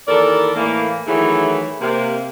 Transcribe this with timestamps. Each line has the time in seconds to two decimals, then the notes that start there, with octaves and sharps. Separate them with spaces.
0.08 D#2 E3 A4 A#4 D5
0.56 A2 E3 A3 A#3
1.07 D#3 E3 F#3 A3 E4 G#4
1.81 C3 A#3